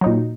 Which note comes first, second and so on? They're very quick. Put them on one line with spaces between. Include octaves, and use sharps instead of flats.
F#3 D#4 A#2